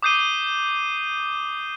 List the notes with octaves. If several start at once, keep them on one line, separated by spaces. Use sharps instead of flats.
D6 D#6 G6 C7 D#7 G7